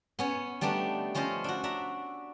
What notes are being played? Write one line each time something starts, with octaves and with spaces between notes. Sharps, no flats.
B3 C#4 C#5
G3 A3 B3 D4 D#4 G4
F3 C#4 F4 C5 D#5
D4 F#4
D4 E5 A#5